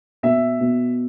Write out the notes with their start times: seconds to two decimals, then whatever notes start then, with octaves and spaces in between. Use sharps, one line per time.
0.23 B2 E5
0.60 B2